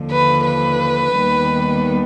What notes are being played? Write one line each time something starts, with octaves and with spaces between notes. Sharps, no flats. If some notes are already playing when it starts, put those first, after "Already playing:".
Already playing: D#2 D3 F3
B4
B4
D#2 D#3 G3 B3